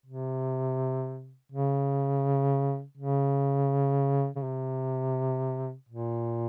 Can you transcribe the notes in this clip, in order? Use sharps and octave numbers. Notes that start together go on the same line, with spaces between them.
C3
C#3
C#3
C#3
C3
A#2